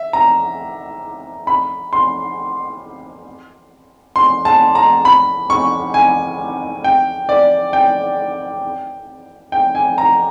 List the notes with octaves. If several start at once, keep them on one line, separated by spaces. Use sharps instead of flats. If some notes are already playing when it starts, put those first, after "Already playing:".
Already playing: E5
A#5
B5
C6
C6
A5
A#5
B5
C#6
G#5
G5
D5
G5
G5
G#5
A#5